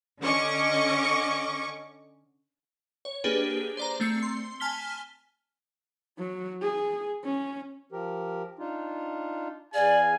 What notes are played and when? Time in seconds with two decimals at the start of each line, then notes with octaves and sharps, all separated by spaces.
0.23 D3 C#4 D#5 C#6 D6
3.05 C#5
3.24 A#3 D4 G4 G#4 B4
3.77 C5 D5 A#5
4.00 A3 C4 E6 C#7
4.23 C6
4.60 G#5 A5 F6 B6 G7
6.19 F#3
6.62 G#4
7.25 C#4
7.92 F3 G4 A#4
8.59 D4 D#4 F4
9.74 E2 G#4 D5 F5 G#5